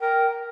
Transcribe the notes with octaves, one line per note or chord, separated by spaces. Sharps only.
A#4 G5